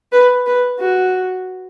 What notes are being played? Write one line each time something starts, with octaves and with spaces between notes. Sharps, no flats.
B4
B4
F#4